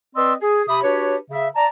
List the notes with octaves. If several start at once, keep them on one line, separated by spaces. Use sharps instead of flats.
C4 B4 D5 D#5 C6 E6
G#4
C3 G4 E5 B5 D#6
D4 F#4 G4 B4 C#5
C#3 E5
D5 A5 A#5